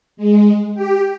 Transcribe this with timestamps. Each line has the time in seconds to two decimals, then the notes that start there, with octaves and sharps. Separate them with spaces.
0.17 G#3
0.74 G4